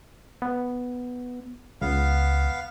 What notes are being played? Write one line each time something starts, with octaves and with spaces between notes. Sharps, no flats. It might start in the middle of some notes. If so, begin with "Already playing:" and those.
B3
C#2 B3 F5